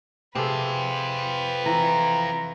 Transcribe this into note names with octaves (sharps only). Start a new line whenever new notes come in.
C3 C4 F4 G#4 A4 B4
E3 A#5